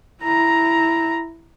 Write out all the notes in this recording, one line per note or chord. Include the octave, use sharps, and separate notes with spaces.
E4 A#5